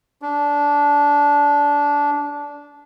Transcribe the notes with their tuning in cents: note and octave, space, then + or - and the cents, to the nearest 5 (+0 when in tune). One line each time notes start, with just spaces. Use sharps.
D4 -20